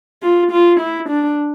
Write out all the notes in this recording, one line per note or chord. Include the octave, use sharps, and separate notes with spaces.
F4
F4
E4
D4